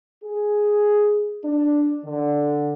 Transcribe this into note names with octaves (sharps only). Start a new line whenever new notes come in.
G#4
D4
D3